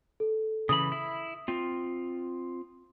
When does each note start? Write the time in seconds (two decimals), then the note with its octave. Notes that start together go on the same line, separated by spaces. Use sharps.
0.20 A4
0.69 C#3 E3 B5 D#6
0.92 E4
1.48 C4 F4